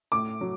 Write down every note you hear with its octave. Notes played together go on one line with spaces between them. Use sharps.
A2 D6
F#3